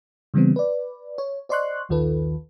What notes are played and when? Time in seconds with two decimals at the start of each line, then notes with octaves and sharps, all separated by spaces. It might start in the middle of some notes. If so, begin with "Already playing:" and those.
0.34 C#3 E3 G3 B3 C4
0.56 B4 D5
1.18 C#5
1.49 C5 D5 D#5 C6 C#6 F#6
1.89 A#1 D#2 D#3 F4 A4 B4